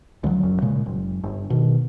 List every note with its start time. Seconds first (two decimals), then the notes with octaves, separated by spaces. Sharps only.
0.24 C#2 D3 F3 F#3
0.43 F#1 F#2
0.62 A#2 C#3 G#3
0.86 F#1
1.23 G1
1.50 B2 D#3